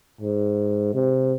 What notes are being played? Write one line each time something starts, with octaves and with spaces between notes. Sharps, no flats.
G#2
C3